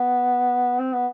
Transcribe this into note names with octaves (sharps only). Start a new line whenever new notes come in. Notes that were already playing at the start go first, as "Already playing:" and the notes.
Already playing: B3
C4
B3